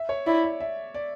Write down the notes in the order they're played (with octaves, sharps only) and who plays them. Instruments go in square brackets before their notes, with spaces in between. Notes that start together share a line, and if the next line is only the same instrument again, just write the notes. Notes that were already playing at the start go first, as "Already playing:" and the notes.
Already playing: [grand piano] E5
C#5
[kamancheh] E4 [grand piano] D5
[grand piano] E5
E5
D5